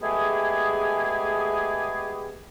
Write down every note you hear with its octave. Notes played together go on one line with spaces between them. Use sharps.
G#3 A3 B3 G4 G#4